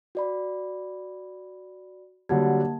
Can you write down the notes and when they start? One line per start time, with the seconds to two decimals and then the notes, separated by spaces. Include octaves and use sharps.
0.15 F#4 D5 B5
2.29 D3 F#3 G3 A#3 A5 G#6